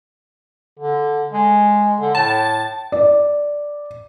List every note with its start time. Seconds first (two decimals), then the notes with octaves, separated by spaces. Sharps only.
0.79 D3
1.33 G#3
2.01 D3
2.15 A2 A5
2.92 D5